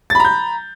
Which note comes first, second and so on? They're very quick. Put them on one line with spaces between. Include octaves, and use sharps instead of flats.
A6 B5 A#5 G6